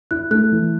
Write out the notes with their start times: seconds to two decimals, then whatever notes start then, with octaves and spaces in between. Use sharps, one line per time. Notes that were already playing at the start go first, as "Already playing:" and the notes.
0.11 E4 F#6
0.31 A3 F#6
0.52 E3